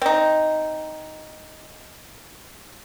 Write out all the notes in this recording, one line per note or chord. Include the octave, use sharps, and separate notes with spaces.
C4 D#4